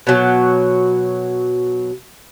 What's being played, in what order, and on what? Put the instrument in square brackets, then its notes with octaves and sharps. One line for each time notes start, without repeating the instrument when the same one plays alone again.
[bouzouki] B2 F#3